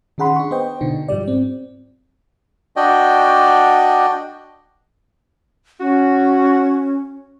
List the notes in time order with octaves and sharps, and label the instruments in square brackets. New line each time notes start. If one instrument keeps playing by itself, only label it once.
[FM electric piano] D#3 C#4 G#4 F#5 B5 C6
D4 C#6
B3 C5 D#5 G5
B2 D3 D4 D#4
G#2 F3 G3 D5
C4
[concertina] D4 F#4 D5 D#5 G5
[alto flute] C#4 [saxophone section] F#4